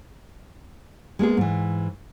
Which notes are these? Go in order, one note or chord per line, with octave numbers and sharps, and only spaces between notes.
G#3 A#3 B3 G#4
G#2 E3